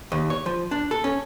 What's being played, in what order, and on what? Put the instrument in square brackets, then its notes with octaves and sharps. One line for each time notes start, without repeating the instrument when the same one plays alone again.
[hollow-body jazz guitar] D#2
C#5
F3
D4
A4
C#4